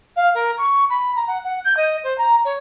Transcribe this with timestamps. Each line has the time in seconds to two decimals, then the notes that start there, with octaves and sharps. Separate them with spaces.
0.16 F5
0.34 A#4
0.58 C#6
0.90 B5
1.16 A#5
1.27 F#5
1.44 F#5
1.64 G6
1.77 D#5
2.04 C5
2.18 A#5
2.44 C#5